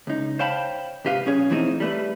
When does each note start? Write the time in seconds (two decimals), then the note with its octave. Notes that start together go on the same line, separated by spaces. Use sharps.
0.07 C#2 D#4
0.39 C5 C#5 F5 G5 A5 B5
1.05 G#2 C3 G4 B4 F5
1.26 B1 C#4 G#4 C#5
1.50 E3 F3 A3 C4 D#4
1.80 G3 A3 B4